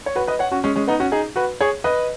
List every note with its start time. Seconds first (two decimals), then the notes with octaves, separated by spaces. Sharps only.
0.06 C#5
0.16 F#4 B4
0.27 B4 D#5
0.39 C#5 F#5
0.52 C#4 F#4
0.64 G#3 C#4
0.76 G#3 C#4
0.87 B3 D#4
1.00 C#4 F#4
1.12 D#4 G#4
1.36 F#4 B4
1.61 G#4 C#5
1.84 B4 D#5